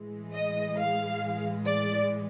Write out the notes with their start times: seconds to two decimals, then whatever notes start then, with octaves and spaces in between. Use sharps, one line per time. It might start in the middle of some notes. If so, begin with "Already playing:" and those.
Already playing: A2 E3 G#3
0.34 D#5
0.78 F5
1.66 D5